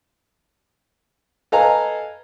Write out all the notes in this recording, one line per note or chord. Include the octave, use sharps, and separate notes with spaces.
A4 B4 D#5 F5 G#5 A#5